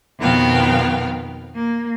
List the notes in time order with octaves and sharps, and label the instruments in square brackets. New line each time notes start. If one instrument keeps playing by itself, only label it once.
[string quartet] F2 B2 D#3 B3 F5 G5
A#3